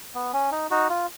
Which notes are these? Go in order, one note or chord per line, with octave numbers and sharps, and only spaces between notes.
B3
C#4
D#4
D#4 F#4
F4